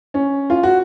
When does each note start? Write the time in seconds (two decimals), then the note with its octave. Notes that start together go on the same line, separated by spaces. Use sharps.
0.14 C#4
0.50 F4
0.63 F#4